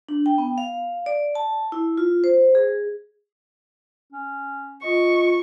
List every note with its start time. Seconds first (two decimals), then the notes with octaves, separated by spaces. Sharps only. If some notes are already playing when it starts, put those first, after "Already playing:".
0.09 D4
0.26 G5
0.38 B3
0.58 F5
1.06 D5
1.35 A5
1.72 E4
1.98 F4
2.24 C5
2.55 G#4
4.13 C#4
4.84 F4 D#5 C#6